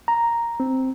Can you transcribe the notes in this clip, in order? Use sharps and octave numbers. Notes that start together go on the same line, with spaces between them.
A#5
C4